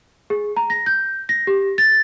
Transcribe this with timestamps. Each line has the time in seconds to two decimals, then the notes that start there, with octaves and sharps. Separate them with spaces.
0.30 G#4
0.57 A#5
0.70 A#6
0.86 G6
1.29 A#6
1.47 G4
1.78 A6